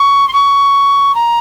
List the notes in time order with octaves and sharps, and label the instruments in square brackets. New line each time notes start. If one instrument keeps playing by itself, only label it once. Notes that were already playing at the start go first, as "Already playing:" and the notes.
Already playing: [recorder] C#6
C6
C#6
A#5